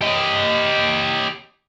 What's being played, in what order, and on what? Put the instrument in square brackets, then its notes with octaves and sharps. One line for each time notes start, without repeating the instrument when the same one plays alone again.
[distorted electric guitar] G4 D#5